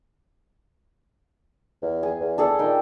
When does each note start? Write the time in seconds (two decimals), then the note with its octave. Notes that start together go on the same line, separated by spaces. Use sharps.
1.83 E2
2.03 G#4
2.20 E2
2.38 D4 G#4 A4
2.59 A#2 D#4 G5